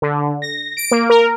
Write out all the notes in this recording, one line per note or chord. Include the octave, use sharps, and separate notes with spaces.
D3
A#6
D7
A#3
A#4